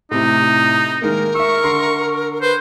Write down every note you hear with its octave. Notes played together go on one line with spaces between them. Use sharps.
A2 C3 D#4
D#3 G#3 A#3 A#4
E5 C#6 E6
D3 C6 C7
B4 C5